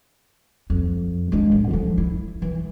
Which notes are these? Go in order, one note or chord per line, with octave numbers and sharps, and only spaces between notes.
F2
G#3 D4
A1
D3 F3
E4
E3